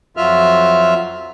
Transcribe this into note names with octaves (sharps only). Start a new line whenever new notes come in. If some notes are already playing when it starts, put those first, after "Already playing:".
F2 F#3 F4 E5 F6